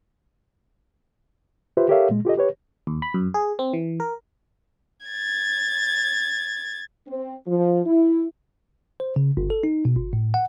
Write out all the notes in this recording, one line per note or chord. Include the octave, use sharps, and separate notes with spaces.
F4 G4 B4 C5 E5
G4 A4 A#4 C#5 E5 F5
A#2 G#3
F4 G4 A4 D#5
G4 B4 C#5
D#2
B5
F#2
G#4
C4
E3
A#4
G#6 A6
C4
F3
E4
C5
C#3
G1
A4
D#4
B2
G1
A2
F#5